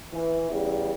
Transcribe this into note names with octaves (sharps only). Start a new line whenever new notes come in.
E3
E2 C#3 G3